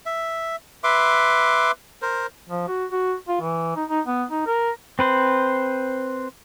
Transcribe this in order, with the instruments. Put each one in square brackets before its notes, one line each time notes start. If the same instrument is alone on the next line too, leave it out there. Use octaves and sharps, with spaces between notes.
[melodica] E5
B4 E5 C6 D6
A#4 C5
[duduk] F3
F#4
F#4
F4
E3
D#4
D#4
B3
D#4
A#4
[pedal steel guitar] C4 B4 C5